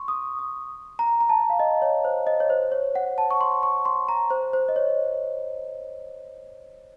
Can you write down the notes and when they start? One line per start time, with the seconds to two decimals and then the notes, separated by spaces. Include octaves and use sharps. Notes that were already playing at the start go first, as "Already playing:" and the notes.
Already playing: C6 C#6
0.08 D#6
0.39 D#6
0.99 A#5
1.21 A#5
1.29 A5
1.50 F5
1.60 D#5
1.82 C#5
2.05 C5
2.27 D#5
2.40 C#5
2.50 C5
2.72 C#5
2.95 F#5
3.18 A5
3.31 C#6
3.41 C6
3.63 C#6
3.85 C6
4.09 A#5
4.30 C5
4.53 C5
4.69 D#5
4.76 C#5